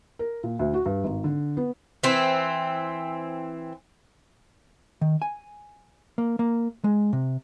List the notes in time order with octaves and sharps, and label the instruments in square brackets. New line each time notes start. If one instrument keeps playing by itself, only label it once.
[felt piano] A#4
A#2
D2
F#4
G2
G#1
D3
B3
[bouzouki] E3 C4
[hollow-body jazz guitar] D#3
G#5
A#3
A#3
G#3
C3